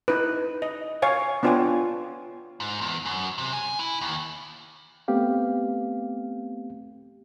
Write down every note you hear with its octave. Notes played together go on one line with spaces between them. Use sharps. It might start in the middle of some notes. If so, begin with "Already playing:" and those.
D#4 E4 B4
D#5
C#5 F5 G#5
B3 D4 F4 C#5 G5 G#5
G#2
E2
F#2
C3
G#5
E4
D#2
A3 B3 C4 G4 F5